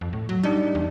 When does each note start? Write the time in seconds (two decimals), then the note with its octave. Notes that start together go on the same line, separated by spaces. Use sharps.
0.01 F2
0.13 A2
0.29 F#3
0.43 G3 D4 D#4
0.75 E2